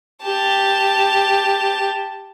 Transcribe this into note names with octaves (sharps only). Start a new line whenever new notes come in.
G4 A5